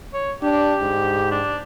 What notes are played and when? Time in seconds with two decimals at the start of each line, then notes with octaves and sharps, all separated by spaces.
0.14 C#5
0.43 D4 G4
0.81 G#2
1.31 D4